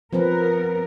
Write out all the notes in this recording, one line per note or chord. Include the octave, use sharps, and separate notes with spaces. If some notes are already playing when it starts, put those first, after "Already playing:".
F3 B3 C4 A#4 B4